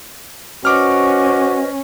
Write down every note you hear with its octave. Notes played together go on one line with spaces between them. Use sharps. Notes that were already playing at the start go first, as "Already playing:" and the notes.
C#4 F#4 B4 C5 D#5 D6 F6